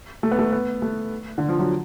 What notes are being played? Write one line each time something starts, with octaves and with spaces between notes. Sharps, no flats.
A3
B3
A3
B3
A3
D3
F3
F#3